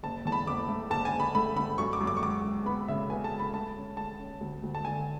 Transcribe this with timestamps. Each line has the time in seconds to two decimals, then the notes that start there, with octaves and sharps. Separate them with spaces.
0.03 F#1 A5
0.25 E2 A5
0.32 B5
0.47 F#1 D6
0.69 A3
0.90 F#1 A5
1.05 G#5
1.13 F#1
1.20 B5
1.35 A3 B5
1.56 A3 B5
1.78 F#2 C#6
1.93 D6
2.01 F#2
2.07 D6
2.17 C#6
2.23 G#3 D6
2.44 G#3
2.66 B3 B5
2.88 C#3 E5
3.10 B3 G#5
3.24 A5
3.31 G#3
3.39 B5
3.53 A3 A5
3.76 C#4
3.97 A3 A5
4.19 C#4
4.41 D2
4.63 D2
4.75 A5
4.85 D3 G#5